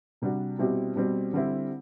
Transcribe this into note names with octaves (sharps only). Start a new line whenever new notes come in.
C3 G3 D4 F#4
B2 G3 C4 E4 G4
B2 G3 C4
D3 G3 C4 E4